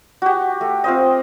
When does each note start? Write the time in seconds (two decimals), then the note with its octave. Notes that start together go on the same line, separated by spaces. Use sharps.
0.22 F#4 G4
0.61 A3
0.84 C4 F4 C5 D#5